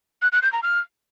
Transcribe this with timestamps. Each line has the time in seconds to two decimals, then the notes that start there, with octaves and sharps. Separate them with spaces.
0.22 F#6
0.32 F#6
0.42 G6
0.53 A#5
0.63 F6